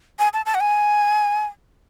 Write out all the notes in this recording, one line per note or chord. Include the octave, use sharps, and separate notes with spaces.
G#5
A5
A5
F#5
G#5